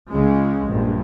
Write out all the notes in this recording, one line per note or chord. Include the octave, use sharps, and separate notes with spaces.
C#2 C#3 G#3
A#1 G2